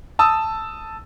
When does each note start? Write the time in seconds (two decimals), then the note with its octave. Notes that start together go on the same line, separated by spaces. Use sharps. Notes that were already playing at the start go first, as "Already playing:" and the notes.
0.19 A5 D#6 E6